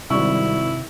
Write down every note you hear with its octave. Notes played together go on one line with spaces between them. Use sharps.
G#1 C3 G3 E4 D5 C#6